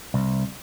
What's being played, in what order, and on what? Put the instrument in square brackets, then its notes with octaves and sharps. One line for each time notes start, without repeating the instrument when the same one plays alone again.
[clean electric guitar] C2